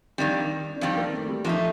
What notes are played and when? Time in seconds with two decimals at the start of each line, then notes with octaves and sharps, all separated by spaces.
0.18 F2 D#3 G3 D4
0.76 D4
0.81 F2 D#3 G3 C4
0.98 A#3
1.13 A3
1.29 G3
1.45 A#2 F3 A3 D#4